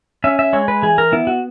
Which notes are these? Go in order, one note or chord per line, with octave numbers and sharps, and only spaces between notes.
C#4 E5
E5
G#3 C#5
B4
E3 G#4
A#4
B3 E4
F#4